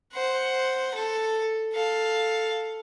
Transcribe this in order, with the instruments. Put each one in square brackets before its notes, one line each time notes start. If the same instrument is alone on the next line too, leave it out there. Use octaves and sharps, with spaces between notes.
[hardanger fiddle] C5 F#5
A4
A4 F5